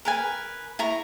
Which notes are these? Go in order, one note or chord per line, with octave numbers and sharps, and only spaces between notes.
A#4 B4 G#5
E4 A#5 C#6